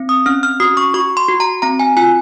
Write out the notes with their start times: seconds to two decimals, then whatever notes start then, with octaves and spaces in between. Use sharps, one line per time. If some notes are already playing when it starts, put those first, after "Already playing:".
Already playing: C4
0.09 D#6
0.26 C#4 F6
0.43 F6
0.60 F#4 D#6
0.77 C#6
0.94 F#4 C#6
1.17 C6
1.29 F#4
1.40 A#5
1.62 C4 A#5
1.79 G#5
1.97 F4 G#5